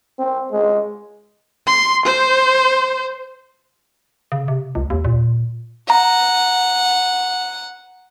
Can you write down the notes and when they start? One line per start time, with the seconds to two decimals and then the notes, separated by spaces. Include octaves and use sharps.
0.19 C4
0.52 G#3
1.67 C6
2.06 C5
4.32 C#3
4.48 C3
4.75 C#2
4.90 D#2
5.05 A#2
5.90 F#5 A#5